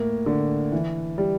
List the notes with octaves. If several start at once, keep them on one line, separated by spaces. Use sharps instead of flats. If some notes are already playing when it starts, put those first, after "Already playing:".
Already playing: A2 A#3
D3
E3
G3